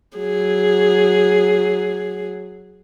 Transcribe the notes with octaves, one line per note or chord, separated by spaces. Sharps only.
F#3 G#4